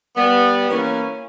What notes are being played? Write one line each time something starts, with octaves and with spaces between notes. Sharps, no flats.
G3 B3
E3 A#3 C#4